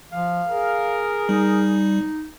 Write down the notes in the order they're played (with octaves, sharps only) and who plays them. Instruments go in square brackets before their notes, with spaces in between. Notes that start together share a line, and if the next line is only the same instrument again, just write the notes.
[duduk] F3 [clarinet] F5
[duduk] G#4 [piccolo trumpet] A#4
[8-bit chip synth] G3 [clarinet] D#4